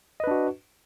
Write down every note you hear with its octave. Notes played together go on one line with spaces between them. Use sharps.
D4 F#4 B4 D#5